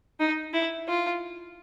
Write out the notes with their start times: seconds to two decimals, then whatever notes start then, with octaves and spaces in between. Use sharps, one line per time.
0.20 D#4
0.54 E4
0.88 F4